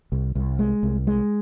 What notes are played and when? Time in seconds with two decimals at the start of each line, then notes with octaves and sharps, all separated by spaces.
0.12 C2
0.35 C2
0.59 G#3
0.83 C2
1.07 G#3